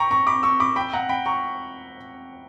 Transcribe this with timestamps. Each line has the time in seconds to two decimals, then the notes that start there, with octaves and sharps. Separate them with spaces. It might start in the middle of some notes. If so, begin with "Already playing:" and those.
Already playing: G5 A#5 B5 C#6
0.11 A#5 C#6
0.27 B5 D6
0.43 C#6 E6
0.60 B5 D6
0.76 G5 B5
0.93 F#5 A#5
1.09 G5 B5
1.26 A#5 C#6